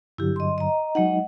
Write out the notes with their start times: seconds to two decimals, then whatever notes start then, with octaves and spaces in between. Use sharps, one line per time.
0.18 G2 D3 F#3 E4 G4
0.36 D#5 C6
0.58 D#5 A#5
0.95 F#3 G#3 D#4 D#5 F#5